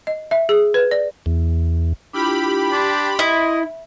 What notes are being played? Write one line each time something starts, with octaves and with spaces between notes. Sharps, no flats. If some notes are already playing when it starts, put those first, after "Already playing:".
D#5
E5
G#4
B4
D5
E2
D4 E4 F4 G4 B5
D4 C6
E4 D#5